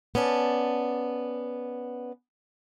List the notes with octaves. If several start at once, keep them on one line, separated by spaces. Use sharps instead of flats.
B3 C#4 D5 A5